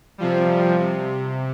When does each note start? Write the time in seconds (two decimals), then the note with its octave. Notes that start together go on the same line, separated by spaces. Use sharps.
0.18 C3 F3 G3
0.79 C3